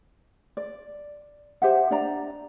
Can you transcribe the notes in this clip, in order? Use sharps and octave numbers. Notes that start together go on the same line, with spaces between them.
D5
G4 C5 E5 F#5
D4 D5 A#5